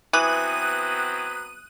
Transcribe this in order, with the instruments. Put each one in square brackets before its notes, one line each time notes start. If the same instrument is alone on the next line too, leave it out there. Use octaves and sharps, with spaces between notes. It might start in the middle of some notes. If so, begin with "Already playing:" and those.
[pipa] E3 [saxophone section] F#3 B3 C4 [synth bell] D#6 F#6 D#7